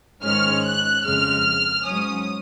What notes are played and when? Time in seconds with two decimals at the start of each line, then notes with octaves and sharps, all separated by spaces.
0.23 G#2 D#3 G#3 C#4 F6
0.64 F#6
1.04 F2 C#3 G#3 F6
1.86 G#2 F#3 C#4 D#6